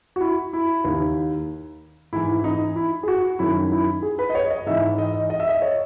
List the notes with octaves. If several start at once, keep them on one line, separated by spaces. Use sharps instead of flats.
F#4
E4
E4
D#2 D#3
G#2 E3 E4
E4
D#4
E4
G#4
F#4
F#2 D#3 E4
E4
G#4
B4
D#5
C#5
D#5
G#2 E3 E5
D#5
D#5
E5
D#5
C#5